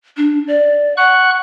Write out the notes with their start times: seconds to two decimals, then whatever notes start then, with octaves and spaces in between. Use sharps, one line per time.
0.17 D4
0.48 D5
0.97 F#5 C#6 F#6